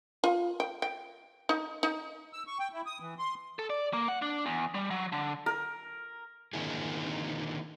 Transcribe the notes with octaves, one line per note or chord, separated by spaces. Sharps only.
F4
G5
G5
D#4
D#4
E6
C#6
G5
E4
D#6
E3
C6
A4
D5
A#3
F#5
D4
E2
G3
F#3
D3
A#4
D3 D#3 A#3 D#4 E4 G#4